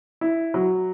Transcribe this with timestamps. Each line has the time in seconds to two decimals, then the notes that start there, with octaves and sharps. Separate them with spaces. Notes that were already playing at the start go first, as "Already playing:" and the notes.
0.21 E4
0.54 F#3